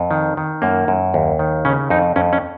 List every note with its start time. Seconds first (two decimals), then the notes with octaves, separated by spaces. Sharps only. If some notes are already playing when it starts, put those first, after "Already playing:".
Already playing: F2
0.11 D#3
0.37 D#3
0.62 F#2 A#3
0.88 F#2
1.14 D#2
1.39 D#3
1.65 C#3 C#4
1.90 F2 D#4
2.16 F2 C#4
2.33 C#4